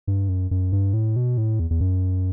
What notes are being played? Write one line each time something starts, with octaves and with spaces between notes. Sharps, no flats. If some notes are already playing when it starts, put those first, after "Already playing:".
G2
F#2
F#2
G2
A2
B2
A2
E2
E2
F#2